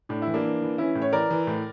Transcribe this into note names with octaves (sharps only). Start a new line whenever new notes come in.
A2 D4
E4
E3
A#3 D4
E3
E3
E3 C#4 E4
A2
C#5
E3 A#4 D5
E3
A2